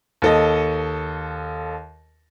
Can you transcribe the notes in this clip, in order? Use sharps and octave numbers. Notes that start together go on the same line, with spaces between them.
D#2 A4 D#5